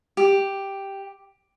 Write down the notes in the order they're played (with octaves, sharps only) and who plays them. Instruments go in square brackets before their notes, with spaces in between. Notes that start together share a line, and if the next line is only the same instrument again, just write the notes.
[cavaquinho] G4